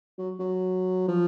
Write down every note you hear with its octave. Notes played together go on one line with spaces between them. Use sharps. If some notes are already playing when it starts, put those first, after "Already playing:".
F#3
F#3
F3